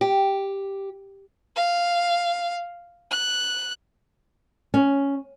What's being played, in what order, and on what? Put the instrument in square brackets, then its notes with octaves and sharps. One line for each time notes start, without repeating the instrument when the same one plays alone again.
[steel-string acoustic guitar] G4
[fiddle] F5
F#6
[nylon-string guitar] C#4